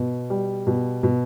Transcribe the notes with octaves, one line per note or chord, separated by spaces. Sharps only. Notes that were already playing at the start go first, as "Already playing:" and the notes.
Already playing: B2
G3
B2
B2